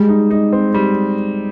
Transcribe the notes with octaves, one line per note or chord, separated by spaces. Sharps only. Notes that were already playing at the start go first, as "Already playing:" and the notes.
Already playing: G3 G#3
D#4
D#4
C4
G3